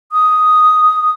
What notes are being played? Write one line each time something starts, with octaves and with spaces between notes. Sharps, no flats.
D#6